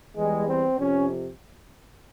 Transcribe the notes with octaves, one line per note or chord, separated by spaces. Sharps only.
E2 E3 G3 G#3
C4
F2 C3 C#4